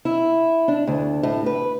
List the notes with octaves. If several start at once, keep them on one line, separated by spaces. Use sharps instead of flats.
E4
D4
D2
A2
B4